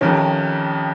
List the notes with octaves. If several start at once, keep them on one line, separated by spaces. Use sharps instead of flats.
F2 C3 D#3 C#4